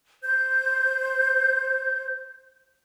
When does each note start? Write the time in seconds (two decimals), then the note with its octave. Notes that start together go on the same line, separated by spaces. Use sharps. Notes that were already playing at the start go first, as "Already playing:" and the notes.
0.23 C5 G6